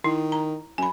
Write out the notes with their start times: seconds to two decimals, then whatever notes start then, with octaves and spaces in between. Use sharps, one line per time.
0.04 D#3 E4
0.32 A#5
0.78 F#2 G#5 B5